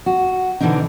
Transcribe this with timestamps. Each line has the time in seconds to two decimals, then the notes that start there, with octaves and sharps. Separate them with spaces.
0.06 F#4
0.60 B2 D3 E3 C4 D4 D#4